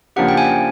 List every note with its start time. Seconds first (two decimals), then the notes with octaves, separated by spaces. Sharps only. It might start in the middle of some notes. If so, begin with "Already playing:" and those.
0.16 C#3 F3 A#3 D4 G4 F#5
0.28 G5
0.37 G#5